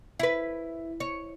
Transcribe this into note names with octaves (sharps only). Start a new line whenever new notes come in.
E4 B4
C#5